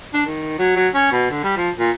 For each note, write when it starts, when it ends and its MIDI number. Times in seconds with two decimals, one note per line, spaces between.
0.14 0.24 62
0.26 0.56 51
0.59 0.74 54
0.76 0.88 54
0.94 1.11 61
1.12 1.26 47
1.31 1.41 50
1.43 1.55 55
1.57 1.70 53
1.79 1.91 46